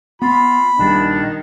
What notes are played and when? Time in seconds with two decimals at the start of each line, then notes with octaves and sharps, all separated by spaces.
0.22 B3 F4 B5
0.79 A#1 D#3 G3 D4